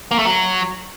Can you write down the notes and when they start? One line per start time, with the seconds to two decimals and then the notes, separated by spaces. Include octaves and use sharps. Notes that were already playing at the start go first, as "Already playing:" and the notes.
0.11 A#3
0.19 A3
0.26 F#3